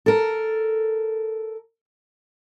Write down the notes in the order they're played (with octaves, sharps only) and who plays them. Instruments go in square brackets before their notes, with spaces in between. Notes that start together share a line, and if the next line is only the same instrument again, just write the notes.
[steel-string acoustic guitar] A4 A#4